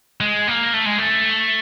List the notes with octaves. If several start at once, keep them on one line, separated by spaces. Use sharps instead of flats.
G#3
A#3
A3
G#3
A3